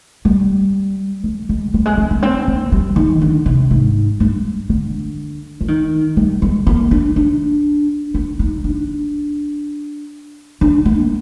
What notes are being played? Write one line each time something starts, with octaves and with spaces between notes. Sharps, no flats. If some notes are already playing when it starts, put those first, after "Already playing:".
G3
G#3
G#3
G3
G#3
C4
A#3
C4
A#3
G3
D#3
D3
C3
G#2
G2
D3
F3
D#3
G3
G#3
A#3
D4
D4
D4
D#4
D4
D4
A#3